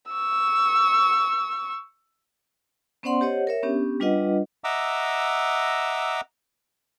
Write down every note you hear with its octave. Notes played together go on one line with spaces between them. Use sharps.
C#6 E6
B3 C#4 C5 D5 F#5 C6
G4 C5 C#5 D#5 F#5
A#4 C#5 E5
B3 C#4 D4 G4
G3 D4 F4 B4 D#5 F#5
D#5 E5 F#5 A#5 D6 E6